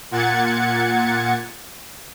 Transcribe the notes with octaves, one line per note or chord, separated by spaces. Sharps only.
A#2 F#5 G#6 A6 C#7